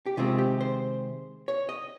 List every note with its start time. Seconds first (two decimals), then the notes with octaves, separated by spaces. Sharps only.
0.06 G4
0.17 C3 D#3 G#3 C4 F4
0.38 G4
0.61 C5
1.48 C#5
1.69 D#5